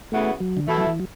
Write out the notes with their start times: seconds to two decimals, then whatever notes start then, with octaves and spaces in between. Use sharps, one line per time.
0.12 C#3 E3 A3 B3 F#4
0.40 F#3
0.57 D3
0.68 B2 E3 A3 E4 A4
0.77 F#3
0.87 E3
1.00 F#3